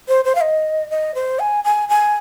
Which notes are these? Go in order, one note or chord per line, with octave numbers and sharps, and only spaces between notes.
C5
C5
F5
D#5
D#5
C5
G#5
G#5
G#5